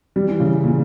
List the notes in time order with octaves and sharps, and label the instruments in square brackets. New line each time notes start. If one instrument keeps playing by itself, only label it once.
[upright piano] G3
E3
C#3
A#2